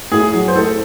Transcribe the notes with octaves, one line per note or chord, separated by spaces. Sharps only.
A2 G#4
F#3
C5
A2 A4